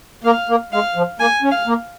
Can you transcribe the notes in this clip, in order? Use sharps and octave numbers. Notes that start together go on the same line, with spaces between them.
A#3 F5
A#3
G#3 F5
F3
A#3 G#5
C#4
F5
A#3